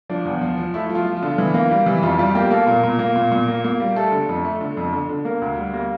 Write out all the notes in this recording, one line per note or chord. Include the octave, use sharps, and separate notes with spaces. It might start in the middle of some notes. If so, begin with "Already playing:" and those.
F3 D4
E2
F3
F3
A3 E4
F3
F4
F3
F4
D3
E3
A#3
G3
E3
F2 F4
G3 F4
A#3 G4
A#3 A4
A#2 A#4
A#2
A#3
A#2
A#2
A#3
A#3
G3
A3 A4
D3
F2
A3
D3
F2
D3
D3
A#3 A#4
D2
G3
A#3